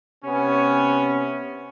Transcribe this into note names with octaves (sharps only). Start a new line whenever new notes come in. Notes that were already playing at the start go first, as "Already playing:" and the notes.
C3 B3 C#4